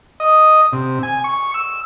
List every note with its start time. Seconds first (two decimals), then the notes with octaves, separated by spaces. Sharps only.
0.20 D#5
0.73 C3
1.03 G#5
1.24 C#6
1.54 E6